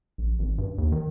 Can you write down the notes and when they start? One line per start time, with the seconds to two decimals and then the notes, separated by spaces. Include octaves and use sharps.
0.18 A#1
0.39 G#1
0.58 G2
0.78 D#2
0.92 D#3